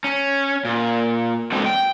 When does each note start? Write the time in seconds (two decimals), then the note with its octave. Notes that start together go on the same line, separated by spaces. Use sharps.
0.04 C#4
0.65 A#2
1.52 G#3 C4 D4 F#4 A4 B4
1.66 G5